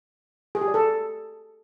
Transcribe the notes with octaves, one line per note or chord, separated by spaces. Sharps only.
G#4
G4
D5
A4